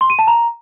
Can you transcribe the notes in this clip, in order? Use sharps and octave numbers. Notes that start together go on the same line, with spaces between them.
C6
D#7
A5
A#5